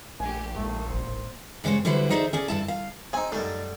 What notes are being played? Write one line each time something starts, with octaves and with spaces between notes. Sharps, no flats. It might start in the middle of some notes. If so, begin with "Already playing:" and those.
A#1 A3 D4 G4 G#5
D#2 A#2 G#3 A3
E1 A1 C5
G2 C#3 G#3 C5 C#5
D3 F#3 G3 E4 B4 C5
D#4 G#4 C5 D5 E5
C#4 G#4 D5
G2 E4 A5
F5
C4 D#4 G#4 G#5
F#2 G3 A3 D4 D#4